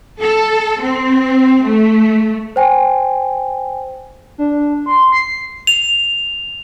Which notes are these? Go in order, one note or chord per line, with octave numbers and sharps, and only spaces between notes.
A4
C4
A3
C5 G5 G#5
D4
C6
C7
F7